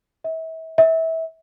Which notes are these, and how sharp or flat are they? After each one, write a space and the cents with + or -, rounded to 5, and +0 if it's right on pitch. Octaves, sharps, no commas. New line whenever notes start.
E5 -35
E5 -25